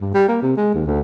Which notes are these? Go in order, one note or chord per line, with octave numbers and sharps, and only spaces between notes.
G2
G3
A#3
C3
G#3
D#2
D2